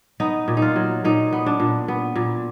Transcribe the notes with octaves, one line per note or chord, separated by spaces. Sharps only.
B3 D#4
A#2
D#4
F4
F#3
A#2 D#4
B3
D4
A#2
B3
A#2